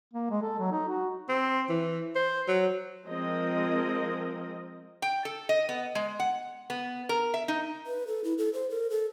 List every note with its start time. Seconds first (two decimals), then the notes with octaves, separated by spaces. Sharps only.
0.14 A#3
0.30 G#3
0.42 A4
0.59 F#3
0.72 D#4
0.88 F#4
1.29 C4
1.69 E3
2.15 C5
2.48 F#3
3.06 F3 G#3 C4 A#4 D#5
5.02 G5
5.25 A4
5.49 D#5
5.69 B3
5.95 G#3
6.20 F#5
6.70 B3
7.09 A#4
7.34 E5
7.48 D#4
7.87 B4
8.07 A4
8.24 E4
8.38 A4
8.53 C5
8.70 A#4
8.90 A4